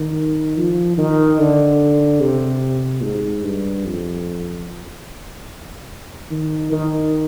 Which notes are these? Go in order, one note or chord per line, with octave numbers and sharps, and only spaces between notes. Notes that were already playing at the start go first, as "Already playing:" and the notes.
Already playing: D#3
F3
D#3
D3
C3
G#2
G2
F2
D#3
D#3